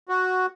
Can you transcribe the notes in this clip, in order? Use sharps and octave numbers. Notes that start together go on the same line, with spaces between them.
F#4